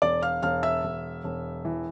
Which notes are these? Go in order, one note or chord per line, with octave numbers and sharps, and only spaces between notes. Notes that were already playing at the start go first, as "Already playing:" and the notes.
E1 D5 D6
F5 F6
E1 F5 F6
E5 E6
E1
E1
E3